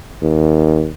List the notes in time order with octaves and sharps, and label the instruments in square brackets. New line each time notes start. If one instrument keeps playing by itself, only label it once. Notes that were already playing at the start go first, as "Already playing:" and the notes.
[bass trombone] D#2